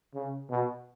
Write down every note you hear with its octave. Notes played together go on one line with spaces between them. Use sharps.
C#3
B2